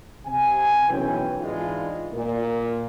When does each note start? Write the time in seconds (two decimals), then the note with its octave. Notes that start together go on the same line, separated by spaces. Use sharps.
0.26 C3 G#5
0.89 B1 F#2 E3 C#4 B4 G5
1.40 G#2 E3 G#3 D4 F4
2.14 A#2